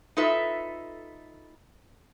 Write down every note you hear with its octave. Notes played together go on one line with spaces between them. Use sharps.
D#4 F4 A4 B4 E5